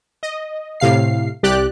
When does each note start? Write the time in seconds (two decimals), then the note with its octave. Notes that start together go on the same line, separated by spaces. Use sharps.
0.23 D#5
0.80 A2 C3 F5 C7
1.43 C2 G4 D5 F#6